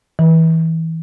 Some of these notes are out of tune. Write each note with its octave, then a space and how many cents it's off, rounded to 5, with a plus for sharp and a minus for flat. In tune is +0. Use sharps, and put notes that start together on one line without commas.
E3 -25